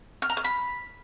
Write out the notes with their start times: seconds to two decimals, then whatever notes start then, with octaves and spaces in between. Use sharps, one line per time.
0.22 F6
0.30 A#5
0.37 F6
0.44 B5